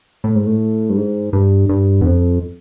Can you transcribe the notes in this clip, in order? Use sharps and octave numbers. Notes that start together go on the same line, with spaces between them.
A2
G#2
A2
G2
G#2
G2
G2
E2
F2